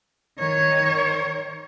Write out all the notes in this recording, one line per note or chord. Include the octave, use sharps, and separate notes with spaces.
D#3 C#5